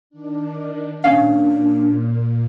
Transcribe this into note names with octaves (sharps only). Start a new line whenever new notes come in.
D#3 D4
A#2 C#4 D4 F5